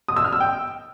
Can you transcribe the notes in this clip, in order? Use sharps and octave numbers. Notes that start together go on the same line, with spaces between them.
D#6
E6
F6
E6
G5